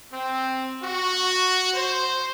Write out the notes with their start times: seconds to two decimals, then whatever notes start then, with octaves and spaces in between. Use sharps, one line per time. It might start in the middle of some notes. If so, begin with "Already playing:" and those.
0.12 C4
0.83 F#4
1.74 C5